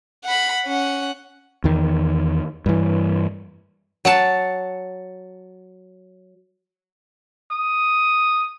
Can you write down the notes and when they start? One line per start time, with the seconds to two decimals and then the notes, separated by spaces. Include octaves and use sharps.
0.24 F#5 B5
0.66 C#4 F#5
1.64 E2 D#3
2.66 G2 E3
4.05 F#3 F#5 A5
7.51 D#6